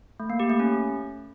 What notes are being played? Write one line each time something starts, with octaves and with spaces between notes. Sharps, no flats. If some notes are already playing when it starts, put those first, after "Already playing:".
A3
A#3
G4
A3
C#4